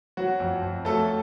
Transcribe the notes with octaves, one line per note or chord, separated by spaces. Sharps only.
F#3 F#4
F2
F2
F#3 A3 A4